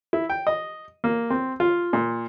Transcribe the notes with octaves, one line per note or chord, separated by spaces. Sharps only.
E4
G5
D#5
A#3
C4
F4
A#2